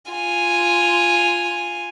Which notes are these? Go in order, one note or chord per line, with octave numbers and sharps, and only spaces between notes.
F4 G#5